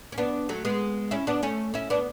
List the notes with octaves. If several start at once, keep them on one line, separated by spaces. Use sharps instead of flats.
C#4
B3 D4
F#3 A3
G#3 B3
C#4 E4
B3 D4
A3 C#4
C#4 E4
B3 D4